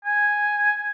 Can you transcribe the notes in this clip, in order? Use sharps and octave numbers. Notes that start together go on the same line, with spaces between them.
G#5